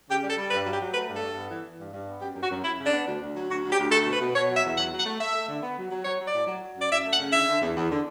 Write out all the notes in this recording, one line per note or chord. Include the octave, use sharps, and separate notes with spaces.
C#3 G4
G3
A4
G3
G2 B4
F#3
G4
F#3
A3 B4
G2
A4
G2
B3
E3
E3
G2
G2
B3
F#2 G4
F#2
F#4
F#2
F#2 E4
C#3
D4
B3
D2
D2
F#3
D2 F#4
D2
G4
D2
A3 A4
B2
B4
B2
B2 C#5
F#3
E5
E2
F#3 F#5
F#3
F#5
A3
A3 E5
A3
D3
B3
F#3
F#3
F#3 C#5
F#3
D5
A2
F#3
F#3
F#2 D5
F#2 E5
A3
F#5
C#3
D3 E5
D3
E2
E2
D3